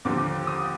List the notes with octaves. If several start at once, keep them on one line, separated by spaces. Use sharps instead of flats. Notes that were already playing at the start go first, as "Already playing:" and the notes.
D#2 D3 F3 D6
D#6